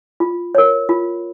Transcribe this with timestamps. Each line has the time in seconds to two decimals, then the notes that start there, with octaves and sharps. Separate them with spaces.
0.20 F4
0.55 A#4 C#5
0.89 F4